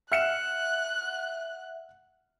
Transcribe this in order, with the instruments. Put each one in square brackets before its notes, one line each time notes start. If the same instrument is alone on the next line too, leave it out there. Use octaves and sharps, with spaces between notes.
[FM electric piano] E5 F#5 [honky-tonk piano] F6 C#7 E7 [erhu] F#6